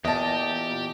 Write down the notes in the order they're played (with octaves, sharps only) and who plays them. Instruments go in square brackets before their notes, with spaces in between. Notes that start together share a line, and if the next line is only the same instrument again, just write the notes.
[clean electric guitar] E2 A#2 [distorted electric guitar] G4 [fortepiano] D#5 A5